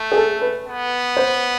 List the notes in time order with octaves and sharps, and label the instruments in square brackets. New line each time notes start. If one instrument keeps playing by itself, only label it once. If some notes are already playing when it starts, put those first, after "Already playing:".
Already playing: [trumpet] A3
[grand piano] G#4
A4
B4
[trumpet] B3
[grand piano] C5